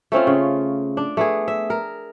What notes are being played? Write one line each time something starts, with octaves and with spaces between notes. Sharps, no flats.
A3 C4 C#4 F4
C#3
D4
A3 B3 G#4
E5
A#4